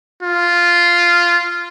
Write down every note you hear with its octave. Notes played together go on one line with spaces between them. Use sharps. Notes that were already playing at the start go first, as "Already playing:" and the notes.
F4